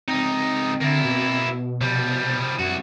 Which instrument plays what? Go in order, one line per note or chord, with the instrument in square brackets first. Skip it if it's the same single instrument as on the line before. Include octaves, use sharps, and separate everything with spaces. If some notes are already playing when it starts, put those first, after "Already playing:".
[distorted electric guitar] C#2 D#4 [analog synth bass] C4
[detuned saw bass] D3 [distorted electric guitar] A#3 E4
[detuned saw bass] B2
[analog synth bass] C3 [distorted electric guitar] F3 G3
[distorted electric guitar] C2 F#4 [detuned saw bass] F#2